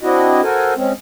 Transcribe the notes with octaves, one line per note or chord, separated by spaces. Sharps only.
C4 D4 E4 F#4 D#5
F#4 A4 A#4 C5 G#5
G#3 C4 C#4